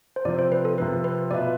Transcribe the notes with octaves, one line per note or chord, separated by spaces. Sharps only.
C5
C3 F3 C4 D5
C5
B4
A4
C3 F3 C4 B4
B4
B2 B3 F4 B4 D5 E5